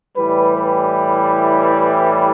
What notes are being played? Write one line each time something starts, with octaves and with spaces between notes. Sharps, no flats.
A2 E3 G3 B4
B4